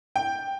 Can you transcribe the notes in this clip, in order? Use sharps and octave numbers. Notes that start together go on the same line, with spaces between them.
G5